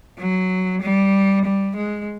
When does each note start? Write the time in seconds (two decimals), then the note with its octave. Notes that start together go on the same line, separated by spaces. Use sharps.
0.19 F#3
0.82 G3
1.45 G3
1.76 G#3